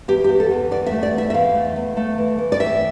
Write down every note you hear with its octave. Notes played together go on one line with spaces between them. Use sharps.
E2 G4
G4
E2
A4
E2
E2 D5
E5
A3
D5
E2
E5
E5
E2 F5
A3
E2
A3
E3
E3
D5
A2 E5